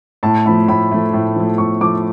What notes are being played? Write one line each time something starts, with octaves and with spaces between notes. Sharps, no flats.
A2 A5
F3 A3 B5
A2 B5
F3 A3
A2
F3 A3
A2 C#6
F3 A3 D6